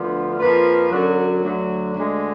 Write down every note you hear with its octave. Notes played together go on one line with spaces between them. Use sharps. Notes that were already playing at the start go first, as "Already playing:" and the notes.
Already playing: D2 D3 F3 B3 F4
F2 F3 A#3 F4 B4
F#2 D3 F#3
D2 D3 F#3
D2 D3 G#3